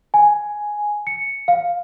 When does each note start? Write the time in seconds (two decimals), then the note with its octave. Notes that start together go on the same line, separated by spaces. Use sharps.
0.14 G#5
1.07 C#7
1.48 F5